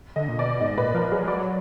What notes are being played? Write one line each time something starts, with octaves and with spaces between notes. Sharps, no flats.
D3 D#5
A#2
B2 D5
G#2 D#5
A#2 B4
F3 A#4
F#3 G#4
G#3
F#3 D5